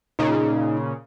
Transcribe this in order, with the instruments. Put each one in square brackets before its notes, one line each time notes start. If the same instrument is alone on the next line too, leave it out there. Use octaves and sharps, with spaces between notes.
[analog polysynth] A#2 C#3 [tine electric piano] D#4